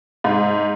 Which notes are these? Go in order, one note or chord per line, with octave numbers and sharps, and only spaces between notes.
G#2